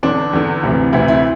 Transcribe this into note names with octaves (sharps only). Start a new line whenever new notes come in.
E2 D3 D4
E2 D3
D2 C3 E3
D2 C3 E3 E4
E4